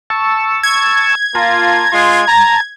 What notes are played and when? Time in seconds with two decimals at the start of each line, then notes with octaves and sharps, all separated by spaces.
0.10 A5 C#6 E6
0.63 G#6
1.35 A#3 F4 A5 A#5
1.92 G#3 F4 C6
2.28 A5 A#5